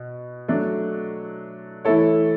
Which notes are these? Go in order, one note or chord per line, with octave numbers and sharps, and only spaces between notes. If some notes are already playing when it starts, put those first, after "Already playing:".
Already playing: B2
F#3 A3 D4
E3 A3 E4 A4 C#5